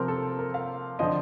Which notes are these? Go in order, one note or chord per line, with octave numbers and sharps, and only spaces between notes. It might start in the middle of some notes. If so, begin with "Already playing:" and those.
Already playing: C3 F3 C4 A#4
A4
A#4
F5
D3 F3 C4 D#5